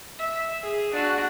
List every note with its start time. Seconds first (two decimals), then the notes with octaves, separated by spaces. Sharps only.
0.19 E5
0.62 G#4
0.92 D4 F#4